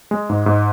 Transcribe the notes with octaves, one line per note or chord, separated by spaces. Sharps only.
G#3
G#2
G#2